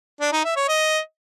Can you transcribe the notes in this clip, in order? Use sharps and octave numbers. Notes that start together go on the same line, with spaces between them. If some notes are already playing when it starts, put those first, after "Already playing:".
D4
D#4
E5
C#5
D#5